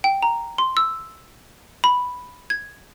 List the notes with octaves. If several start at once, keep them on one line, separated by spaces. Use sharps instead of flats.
G5
A#5
C6
E6
B5
G#6